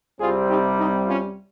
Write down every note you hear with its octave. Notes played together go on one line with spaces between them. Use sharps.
C2 C3 G3 C4 F4 G#4
D#4 G4
C4 D#4
C#4 F4